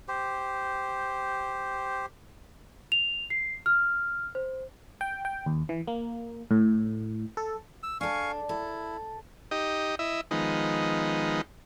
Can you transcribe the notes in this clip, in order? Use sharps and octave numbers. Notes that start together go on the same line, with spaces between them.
G4 C5
F7
C7
F6
C5
G5
G5
D#2
E3
A#3
A2
A4
E6
D4 A4 F5 G#5 C#6
E4 A4
D#4 G4 D#5
E4 D#5 E5
D#3 F3 G#3 B3 D#4